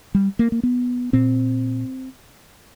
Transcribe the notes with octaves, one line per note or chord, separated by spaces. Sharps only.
G3
A#3
A#3
B3
A#2 C4